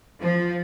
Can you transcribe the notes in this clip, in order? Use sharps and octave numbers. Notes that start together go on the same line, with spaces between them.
F3